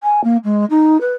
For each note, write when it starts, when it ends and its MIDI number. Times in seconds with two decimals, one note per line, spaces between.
0.03 0.20 80
0.24 0.37 58
0.44 0.65 56
0.70 1.00 63
1.01 1.13 71